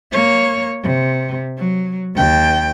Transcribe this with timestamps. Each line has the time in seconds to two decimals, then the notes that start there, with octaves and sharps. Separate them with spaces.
0.12 A#3 C#5
0.83 C3
1.58 F#3
2.15 D#2 G5